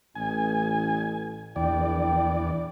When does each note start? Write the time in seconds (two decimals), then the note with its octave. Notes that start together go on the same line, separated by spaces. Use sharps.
0.15 A1 G#5
1.56 A#1 E2 D5 G5